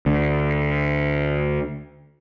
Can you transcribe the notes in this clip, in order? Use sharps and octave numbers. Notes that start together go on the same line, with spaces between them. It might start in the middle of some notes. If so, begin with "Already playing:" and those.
D2 D3